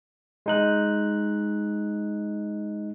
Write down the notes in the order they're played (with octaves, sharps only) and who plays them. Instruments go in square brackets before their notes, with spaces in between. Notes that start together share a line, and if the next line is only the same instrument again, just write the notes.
[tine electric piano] G#3 D#4 F#6